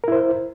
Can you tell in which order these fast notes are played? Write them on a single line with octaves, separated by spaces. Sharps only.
A#4 E4 C5